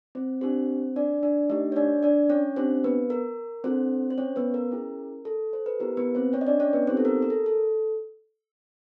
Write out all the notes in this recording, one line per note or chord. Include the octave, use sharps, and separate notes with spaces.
C4 C5
C4 D4 G4 C5
D4 D5
D4 D5
A3 D4 D#4 G4 D#5
C#5
D4 D5
D4 D5
C#4 C#5
C4 D4 G4 C5
B3 B4
A#4
C4 D4 F#4 A4 C5
C5
C#4 C#5
B3 B4
A#4
C#4 E4 G#4
A4
C5
B4
B3 E4 G4 A#4
B3 B4
C4 C5
C#4 C#5
D#5
D4 D5
C#4 C#5
B3 B4
B3 C4 D#4 G4 C5
A4
A#4
A#4
A4
A4